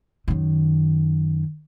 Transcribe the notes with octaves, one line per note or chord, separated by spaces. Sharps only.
F#2 D#3